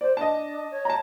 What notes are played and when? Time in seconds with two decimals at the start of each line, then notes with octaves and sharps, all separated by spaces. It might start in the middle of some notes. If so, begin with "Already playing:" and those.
0.01 C5 D5
0.17 D4 D#5 A5
0.71 C#5
0.85 A5 A#5